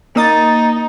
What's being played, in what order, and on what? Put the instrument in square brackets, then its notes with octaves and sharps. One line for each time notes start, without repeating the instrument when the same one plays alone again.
[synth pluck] A#3 D#6 A6 [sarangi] D#4